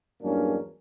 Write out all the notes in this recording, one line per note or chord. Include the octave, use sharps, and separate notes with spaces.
E2 G2 F#3 A#3 C#4 D4